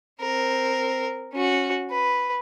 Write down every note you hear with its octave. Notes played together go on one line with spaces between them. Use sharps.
C4 A#4
C#4 F#4
B4